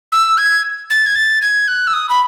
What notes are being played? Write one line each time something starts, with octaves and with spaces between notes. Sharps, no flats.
E6
G#6
A6
G#6
A6
G#6
F#6
E6
D#6
B5